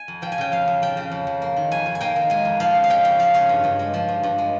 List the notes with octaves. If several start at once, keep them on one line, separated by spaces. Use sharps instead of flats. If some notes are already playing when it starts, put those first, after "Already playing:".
Already playing: G#5
F2
F3 G5
G#5
C#3 G5
F2 F5
F2
F3 G5
C#3
F2
F2
A#3
D#3
F2 G#5
F2
G#5
A#3 G5
D#3
G#3 G#5
F2
F3 F5
C#3
F5
G#3 G5
F2 G5
F3 F5
C#3 C#5
G2
G2
G#3
F3
G2
G2
G#3